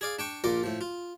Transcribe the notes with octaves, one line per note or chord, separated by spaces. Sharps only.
G#4 D5 F5
D4 G5 C#6
A#1 A#2 F4 D5 A#5
A2 F3
F4